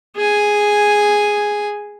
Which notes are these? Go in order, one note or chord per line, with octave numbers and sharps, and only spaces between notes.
G#4 G#5